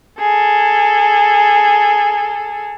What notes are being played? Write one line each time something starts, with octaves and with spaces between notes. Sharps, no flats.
G#4 A4